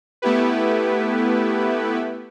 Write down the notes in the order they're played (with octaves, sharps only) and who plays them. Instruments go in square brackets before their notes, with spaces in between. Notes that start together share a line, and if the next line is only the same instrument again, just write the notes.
[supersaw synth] A3 B3 E4 G4 B4